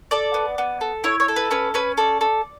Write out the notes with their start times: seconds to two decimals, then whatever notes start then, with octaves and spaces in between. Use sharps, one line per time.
0.11 A4 D5
0.34 B3
0.58 B3
0.81 A4
1.04 E4 C#5
1.20 C#5
1.28 A4
1.36 B4
1.51 C#4 B4
1.74 C#4 B4
1.97 A4 D5
2.21 A4